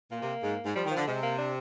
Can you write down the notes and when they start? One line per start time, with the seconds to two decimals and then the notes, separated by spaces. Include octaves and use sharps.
0.11 A#2 A#3
0.22 C3
0.43 G#2
0.64 G#2
0.75 F3 G3
0.85 D#3
0.91 F3
0.96 D3
1.06 C3 G#3
1.23 A#3
1.38 D4